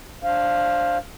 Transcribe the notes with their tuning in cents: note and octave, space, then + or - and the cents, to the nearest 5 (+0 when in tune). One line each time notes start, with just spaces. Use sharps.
D4 +0 C5 +15 F5 +0